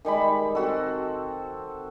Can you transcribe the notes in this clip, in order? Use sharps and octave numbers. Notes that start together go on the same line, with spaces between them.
D#3 G3 G#3 B5
C4 F#4 A4